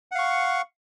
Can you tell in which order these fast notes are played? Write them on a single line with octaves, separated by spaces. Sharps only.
F#5 F5 C#6